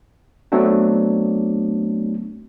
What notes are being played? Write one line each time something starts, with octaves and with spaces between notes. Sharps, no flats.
F#3 A3 B3 C4 D4